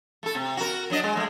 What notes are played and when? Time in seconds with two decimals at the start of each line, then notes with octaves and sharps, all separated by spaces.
0.23 A3 A4
0.35 C3
0.57 F#4 A#4
0.90 F#3 D4 D#5
1.04 G#3
1.16 G#3 A3